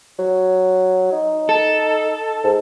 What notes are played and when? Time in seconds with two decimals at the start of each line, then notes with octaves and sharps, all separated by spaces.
0.19 F#3
1.12 D#4
1.49 A4
2.44 G#2